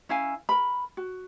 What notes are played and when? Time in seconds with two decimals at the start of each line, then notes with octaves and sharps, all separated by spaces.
0.09 C#4 E4 F5 G#5
0.49 A#4 B5
0.97 F#4